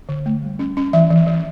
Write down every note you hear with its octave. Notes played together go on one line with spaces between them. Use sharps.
D3
A3
G3
C#4
C#4
E3 E5
E3
E3